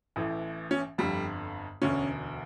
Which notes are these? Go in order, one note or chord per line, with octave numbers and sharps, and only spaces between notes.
A1 A2 E3
C#4
G1 F2 D3 G3
E1 D2 D3 C#4